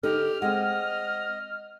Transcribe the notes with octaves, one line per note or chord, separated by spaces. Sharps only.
D3 D#4 G4 A4 F6
G#3 C4 D#5 F#5